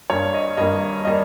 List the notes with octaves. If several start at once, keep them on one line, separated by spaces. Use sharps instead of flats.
G2 G3 A#3 C#5
D#5
G2 G3 A#3 D#5
G3 A#3 D#5